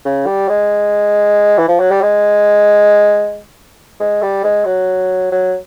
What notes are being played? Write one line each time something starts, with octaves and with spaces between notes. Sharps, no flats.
C#3
G3
G#3
E3
F3
F#3
G3
G#3
G#3
G3
G#3
F#3
F#3